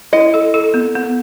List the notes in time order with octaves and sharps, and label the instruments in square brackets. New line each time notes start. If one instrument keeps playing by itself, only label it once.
[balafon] E4 [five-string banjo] D#5
[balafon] A4
A4
B3
B3